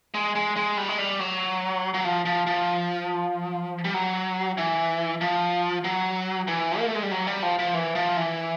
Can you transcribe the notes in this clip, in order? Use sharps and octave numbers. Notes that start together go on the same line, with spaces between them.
G#3
G#3
G#3
G3
G#3
G3
F#3
F#3
F3
F3
F3
G3
F#3
E3
F3
F#3
E3
A#3
A3
G#3
G3
F#3
G3
F3
F3
E3
F3
E3